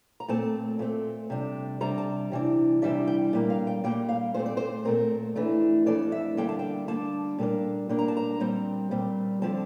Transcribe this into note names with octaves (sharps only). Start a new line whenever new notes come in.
A#5
A#2 A3 C4 A5
A#2 A3 C4
C3 G3 D4
C3 G3 D4 A#5
A5
C3 E3 G3 D4
C3 E3 G3 D4 E5
G5
A#2 G3 A#3
F5
G5
A#2 G3 A#3 G5
F5
A#2 A3 C4 C5
D5
C5
A#2 A3 C4 A#4
F2 E3 A3 D4
F2 E3 A3 D4 D5
E5
D3 G3 A#3 D4 G5
A5
G5
D3 G3 A#3 D4 A5
A#2 G3 A#3 D4
A#2 G3 A#3 D4
A#5
A5
A#5
A#2 G3 C4
A#2 G3 C4
D3 F3 C4 A5